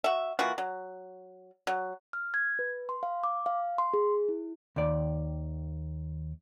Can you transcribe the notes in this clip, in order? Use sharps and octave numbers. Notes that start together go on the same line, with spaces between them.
F#4 E5
E3 A#3 F4 F#4
F#3
F#3
F6
G#6
B4
C6
F5
D6
F5
C6
G#4
E4
D#2 D#3 D5